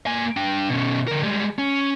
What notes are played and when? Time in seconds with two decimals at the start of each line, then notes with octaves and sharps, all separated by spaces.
0.07 A#3 G#5
0.37 D4 G5
0.69 B2 C#4
1.07 D3 A#4
1.23 G3 G#3
1.59 C#4